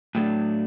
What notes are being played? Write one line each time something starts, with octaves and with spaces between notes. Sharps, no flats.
A2 F#3 A3 D4